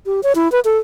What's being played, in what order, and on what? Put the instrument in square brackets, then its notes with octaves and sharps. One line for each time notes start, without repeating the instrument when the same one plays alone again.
[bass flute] G4
C#5
E4
B4
A4